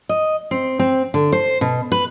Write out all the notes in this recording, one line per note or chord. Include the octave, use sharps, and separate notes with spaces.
D#5
C4
C4
D3
C5
B2
B4